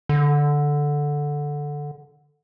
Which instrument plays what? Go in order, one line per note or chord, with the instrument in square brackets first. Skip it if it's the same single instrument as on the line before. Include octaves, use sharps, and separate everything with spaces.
[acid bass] D3